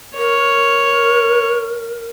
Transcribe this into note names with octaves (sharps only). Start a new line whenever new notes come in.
A#4 C#5